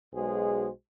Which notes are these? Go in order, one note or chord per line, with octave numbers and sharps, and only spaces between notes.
B1 G#3 F#4 G#4 C5